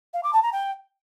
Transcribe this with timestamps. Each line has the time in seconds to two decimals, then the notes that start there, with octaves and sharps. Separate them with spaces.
0.14 F5
0.23 D6
0.33 A5
0.43 A#5
0.53 G5